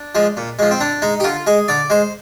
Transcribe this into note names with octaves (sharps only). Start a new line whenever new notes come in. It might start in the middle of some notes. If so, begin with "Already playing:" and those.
Already playing: D4
F3 G#3
A#2
F3 G#3
C4
D3 D4
G#3 D#4
G4
D3 F4
G#3 G#4
D3 D5
G#3 C5